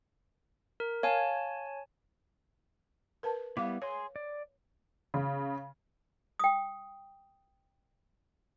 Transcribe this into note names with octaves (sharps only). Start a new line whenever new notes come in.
A#4
C#5 F5 G#5 A5
A#4 B4 A5
G3 B3 E4 F5 D6
G#4 C#5 G#5 C6
D5
C#3
G5 D#6